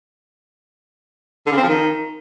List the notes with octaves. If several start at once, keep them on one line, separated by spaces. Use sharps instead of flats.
D3
C#3
C4
F3
D#3